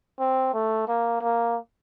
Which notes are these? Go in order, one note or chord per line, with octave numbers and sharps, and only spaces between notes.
C4
A3
A#3
A#3